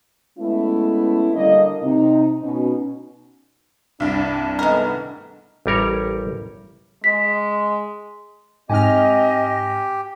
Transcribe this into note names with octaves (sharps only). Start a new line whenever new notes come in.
G#3 A3 B3 C#4 E4
D3 G3 A#3 D#5
C3 D#4
B2 C#4 D#4
C2 G2 D4
D#3 G#3 A3 B3 A#4
A1 G3 A#4 C#5
G#3 B6
G#2 C4 G4 D#5 G#5 F6